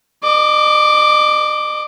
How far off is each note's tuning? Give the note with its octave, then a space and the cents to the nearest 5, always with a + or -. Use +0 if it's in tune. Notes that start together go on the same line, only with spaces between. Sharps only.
D#5 -40 D6 +0